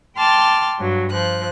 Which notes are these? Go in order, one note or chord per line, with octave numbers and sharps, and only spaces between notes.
G5 A5 C6 D6 F6 A6
G2 F#3
F3 F#6